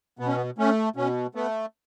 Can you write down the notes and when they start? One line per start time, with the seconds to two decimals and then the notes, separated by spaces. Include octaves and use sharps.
0.19 B2 B3
0.28 C#4
0.36 B3
0.58 A3 C#4
0.96 B2 C#4
1.35 A3 B3